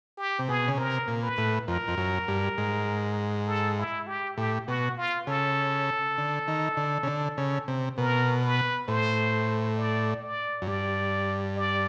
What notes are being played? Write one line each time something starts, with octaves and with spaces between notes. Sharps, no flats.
G4
C3
B2 G#4
C#3
C3 A#4
A#2
B4
A2
F2 A#4
F2
F#2
G2
G#2
A4
E4
G4
A2 G4
B2 F#4
F4
C#3 A4
D3
D#3
D3
C#3
D3
C#3
C3
B2 A#4
B4
A2 C5
D5
D5
F#2
G2 D5
D5